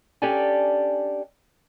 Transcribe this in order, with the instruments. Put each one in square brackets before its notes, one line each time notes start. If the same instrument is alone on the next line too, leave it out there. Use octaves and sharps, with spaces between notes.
[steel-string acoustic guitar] C#4 D4 G4 A4 D5 G#5